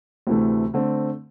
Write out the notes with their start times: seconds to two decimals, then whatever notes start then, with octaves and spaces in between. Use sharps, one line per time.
0.27 D2 C3 E3 A3
0.74 D3 A3 C4